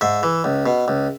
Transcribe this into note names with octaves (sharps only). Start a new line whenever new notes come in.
G#2 E5
E3
C#2
B2
C#2